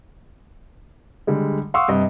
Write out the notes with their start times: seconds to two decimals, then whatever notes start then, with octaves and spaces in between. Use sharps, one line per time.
1.27 D3 G3 G#3
1.74 F5 F#5 C6 C#6 D#6 E6
1.88 G2 C3 D#5